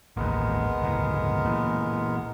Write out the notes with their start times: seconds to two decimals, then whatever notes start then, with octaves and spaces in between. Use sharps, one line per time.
0.17 A1 D#2 G#3 B3 A#4
0.82 G1 C#2 A2
1.45 A#2 E3